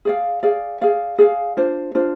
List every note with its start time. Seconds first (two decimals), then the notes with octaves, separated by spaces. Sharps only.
0.05 G#4 D5 F5
0.43 G#4 D5 F5
0.81 G#4 D5 F5
1.18 G#4 D5 F5
1.57 D4 F4 C5
1.95 D4 F4 C5